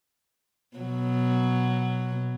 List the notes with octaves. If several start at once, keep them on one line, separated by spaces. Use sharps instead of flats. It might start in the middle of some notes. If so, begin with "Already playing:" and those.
B2 F#3